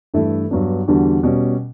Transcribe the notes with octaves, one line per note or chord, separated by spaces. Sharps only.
G2 E3 A3 E4 A4
G2 F#3 B3 D4
E2 D3 G3 D4 F#4
B2 G3 C#4